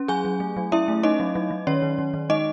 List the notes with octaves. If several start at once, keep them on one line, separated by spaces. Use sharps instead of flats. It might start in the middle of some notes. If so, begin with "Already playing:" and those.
Already playing: C#4
F#3 G#4 G#5
F#3
A3
F#3
C#4 E4 E5
A3
C#4 D#4 D#5
F#3
F#3
F#3
D#3 C#4 C#5
D#3
D#3
D#3
G#3 D#4 D#5